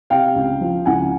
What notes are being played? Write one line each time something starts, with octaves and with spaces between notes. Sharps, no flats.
C3 F5 G5
C#2
F3
C#2 F#5 G#5